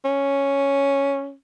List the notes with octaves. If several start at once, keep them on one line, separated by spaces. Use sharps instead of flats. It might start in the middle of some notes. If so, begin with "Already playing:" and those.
C#4